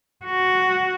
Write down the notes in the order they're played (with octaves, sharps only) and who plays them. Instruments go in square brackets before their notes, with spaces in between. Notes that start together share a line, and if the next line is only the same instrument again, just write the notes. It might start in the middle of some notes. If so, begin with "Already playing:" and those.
[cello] F#4